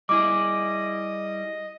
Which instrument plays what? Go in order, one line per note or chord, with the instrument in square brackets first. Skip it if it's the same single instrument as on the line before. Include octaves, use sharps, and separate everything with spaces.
[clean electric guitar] G3 E4 G#4 [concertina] D#5 [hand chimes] D6